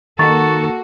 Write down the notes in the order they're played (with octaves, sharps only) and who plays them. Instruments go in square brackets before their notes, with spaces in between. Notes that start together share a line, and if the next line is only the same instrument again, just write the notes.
[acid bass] D#3 [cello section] A#3 F#4 [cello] A4 [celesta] A#5 C#6 A6